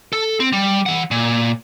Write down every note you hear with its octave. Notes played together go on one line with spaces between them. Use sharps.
A4
C4
G3
E3 F#5
A#2